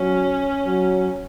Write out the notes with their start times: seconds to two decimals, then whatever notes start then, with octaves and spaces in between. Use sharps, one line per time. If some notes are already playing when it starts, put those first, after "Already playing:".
Already playing: F#3 C#4
0.65 F#3